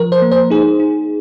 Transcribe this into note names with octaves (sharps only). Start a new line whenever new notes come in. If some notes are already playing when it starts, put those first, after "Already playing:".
Already playing: F3 A#4
C5
A#3
C5
D#4 G#4
D#4